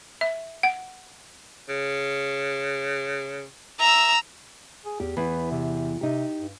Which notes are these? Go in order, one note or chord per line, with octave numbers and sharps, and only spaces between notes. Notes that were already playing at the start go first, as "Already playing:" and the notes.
E5
F#5
C#3
E5 A#5 E6
G#4
E2 G4
E2 B4
C3
C3 D#4 G4
G2